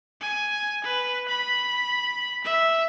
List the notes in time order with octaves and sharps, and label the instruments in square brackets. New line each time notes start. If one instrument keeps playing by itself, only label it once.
[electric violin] G#5
B4
B5
E5